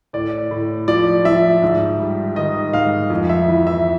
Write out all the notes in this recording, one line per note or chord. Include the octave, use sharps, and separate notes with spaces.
A2 D5
A2
F3 D5
F3 E5
G#2
G3
D#3 D#5
G#2 F5
F2
E5
E3
E5